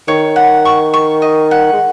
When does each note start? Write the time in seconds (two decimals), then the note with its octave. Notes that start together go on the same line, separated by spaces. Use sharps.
0.08 D#3 C#5
0.36 F#5
0.65 C#6
0.94 C#6
1.22 D#5
1.51 F#5
1.73 G#3